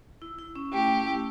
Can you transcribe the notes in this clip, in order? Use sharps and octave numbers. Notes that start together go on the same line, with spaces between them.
E4
E4
C#4
A3 G4
A3
E4